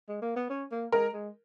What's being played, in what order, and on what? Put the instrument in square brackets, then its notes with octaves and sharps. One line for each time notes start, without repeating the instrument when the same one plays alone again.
[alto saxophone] G#3
A#3
B3
C#4
A#3
[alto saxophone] G#3 [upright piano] A#4
[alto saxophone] G#3